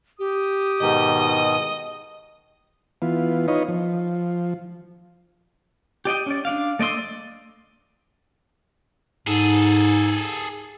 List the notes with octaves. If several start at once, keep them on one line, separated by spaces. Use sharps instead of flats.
G4 D#6
G#2 B2 D#3 D#5
E3 B3 F4
D#4 F4 B4 C#5 D#5
F3
G4 D5 D#5 G5
C#4 D5
D4 D5 F5
A3 D5 D#5 C6 E6
D5
G#2 G#4 A4